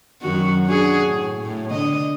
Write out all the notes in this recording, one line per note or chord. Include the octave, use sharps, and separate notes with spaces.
F#2 D#3 F#4
D4 F#4 G#4
A2
A2
D3 D#5